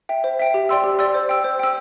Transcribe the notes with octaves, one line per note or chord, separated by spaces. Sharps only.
E5 G5
C5
E5 G5
G4
D5 G5 C6 E6
G4
D5 G5 C6 E6
C5
G5 E6
C5
G5 E6